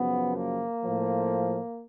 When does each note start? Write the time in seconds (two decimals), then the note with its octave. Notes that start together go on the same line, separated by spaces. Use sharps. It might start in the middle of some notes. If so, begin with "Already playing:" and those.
Already playing: F#2 C#3 F3 B3
0.36 A#3
0.83 A2 F3